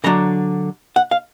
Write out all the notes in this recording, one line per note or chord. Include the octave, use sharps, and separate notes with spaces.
D3 F#3 D4 A#5
F#5
F5